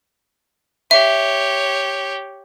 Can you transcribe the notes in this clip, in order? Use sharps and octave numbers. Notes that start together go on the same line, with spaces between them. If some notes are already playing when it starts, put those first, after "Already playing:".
G4 C#5 E5